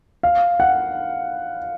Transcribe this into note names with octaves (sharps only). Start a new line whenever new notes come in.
F5
F#5